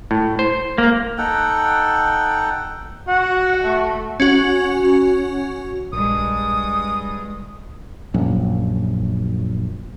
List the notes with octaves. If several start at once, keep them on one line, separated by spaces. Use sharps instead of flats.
A2
C5
A#3
D#4 A4 F#5 G5
F#4 F#5
A3
C#4 F#4
A#1 G2 G#3 D#6
A#1 F#2